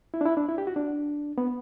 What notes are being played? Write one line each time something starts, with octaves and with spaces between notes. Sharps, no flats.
E4
D4
E4
D4
E4
G4
F#4
D4
B3